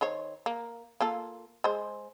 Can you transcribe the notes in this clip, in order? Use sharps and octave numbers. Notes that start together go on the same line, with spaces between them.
D#3 C5 C#5
A#3
A#3 F4 A4
G#3 C5